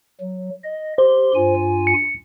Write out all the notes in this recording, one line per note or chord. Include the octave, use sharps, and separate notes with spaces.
F#3
D#5
G4 C5 C6
G2 F4 G#5
C#7